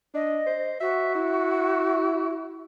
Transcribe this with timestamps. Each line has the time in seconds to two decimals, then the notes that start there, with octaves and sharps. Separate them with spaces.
0.14 D4 D#5
0.46 C5
0.80 F#4 E5
1.15 E4